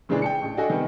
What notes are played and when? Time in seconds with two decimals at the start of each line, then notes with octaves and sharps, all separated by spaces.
0.09 A#2 C#3 E3 G#3 D4 G#4
0.22 G5 A5 C#7
0.42 A1
0.57 D4 F#4 A4 D#5 G5 G#5
0.69 C3 D#3 G3 B3